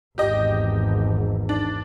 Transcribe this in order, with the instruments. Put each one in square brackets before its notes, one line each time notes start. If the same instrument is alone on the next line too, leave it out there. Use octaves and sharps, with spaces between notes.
[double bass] G#1 E2 [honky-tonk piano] G4 D#5
[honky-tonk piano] D4